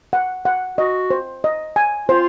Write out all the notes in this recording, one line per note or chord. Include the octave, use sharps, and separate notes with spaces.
F#5
F#5
F#4 D#5
C5
D#5
G#5
F4 C5